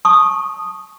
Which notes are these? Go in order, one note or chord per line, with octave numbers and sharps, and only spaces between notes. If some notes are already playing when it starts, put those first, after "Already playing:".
A5 C#6 D#6